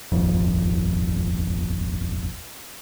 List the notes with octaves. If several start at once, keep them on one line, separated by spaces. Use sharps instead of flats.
D#1 G#1 F2